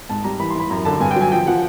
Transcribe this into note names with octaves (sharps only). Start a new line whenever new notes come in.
G#2 A5
G3 A#5
E3 B5
C6
E3 B5
F#2 A#5
D3 A5
G2 G#5
G5
F#3
G#5
F3 G5
F3 F#5